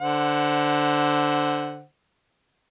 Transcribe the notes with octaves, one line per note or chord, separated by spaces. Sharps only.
D3 C5 F#5